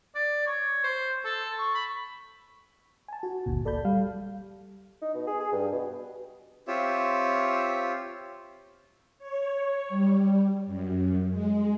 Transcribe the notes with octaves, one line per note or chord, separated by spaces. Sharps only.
D5
C#5
C5
A4
C#6
B5
G#5 A5
F#4
G1 D2 A#2
A4 D5 A5 B5 G6
G3 F5
D#4
B2
G#4
G#4
G2
B2
C4 F4 G4 C#5 E5
C#5
G3
F#2
G#3